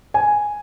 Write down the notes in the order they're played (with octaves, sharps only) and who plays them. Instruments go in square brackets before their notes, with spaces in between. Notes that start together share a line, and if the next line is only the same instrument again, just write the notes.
[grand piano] G#5